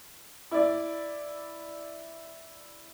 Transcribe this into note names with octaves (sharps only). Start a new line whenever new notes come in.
E4 D5